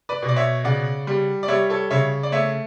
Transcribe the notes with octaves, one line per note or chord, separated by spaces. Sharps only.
B4 D5
B2
D5
C#5 E5
C#3 D5 F#5
G3
D5
G3 C#5 E5
A4 C#5
C#3 C#5 E5
D5
A3 C#5 E5